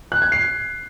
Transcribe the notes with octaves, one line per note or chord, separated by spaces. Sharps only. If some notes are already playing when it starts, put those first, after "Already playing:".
F#6
G#6
C7